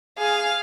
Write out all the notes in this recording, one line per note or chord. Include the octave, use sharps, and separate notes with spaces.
G#4 F5